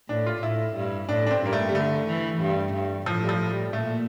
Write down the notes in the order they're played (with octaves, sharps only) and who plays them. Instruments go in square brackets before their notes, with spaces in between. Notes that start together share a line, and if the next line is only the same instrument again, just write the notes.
[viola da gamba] A2 [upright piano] D4
[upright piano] F4
[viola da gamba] A2 [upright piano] E4
[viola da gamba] G2
[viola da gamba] A2 [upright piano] D4
[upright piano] D4
C4
[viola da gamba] G2 [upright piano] A#3
[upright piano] A3
G3
[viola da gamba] D3 [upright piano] A3
[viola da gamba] E3
G2
G2
[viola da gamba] A2 [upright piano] F3
[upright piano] G3
F3
G3
[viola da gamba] A#2 [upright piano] A3